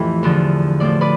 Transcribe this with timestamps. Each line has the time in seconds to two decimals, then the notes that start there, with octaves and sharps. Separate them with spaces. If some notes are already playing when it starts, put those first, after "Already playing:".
Already playing: F2 A2 E3 G4 B4
0.23 E2 D3 F3
0.80 A2 F3 D5
1.01 B4 D5